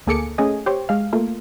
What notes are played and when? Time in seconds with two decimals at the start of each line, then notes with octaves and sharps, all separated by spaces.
0.07 D2 A#3 G#4 A4 D6 C#7
0.38 A3 C#4 G#4 D#5
0.66 G4 C5 C#5
0.89 G#3 F5
1.13 A3 A#3 F4